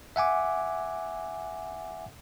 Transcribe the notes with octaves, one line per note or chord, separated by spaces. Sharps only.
E5 F#5 G#5 D6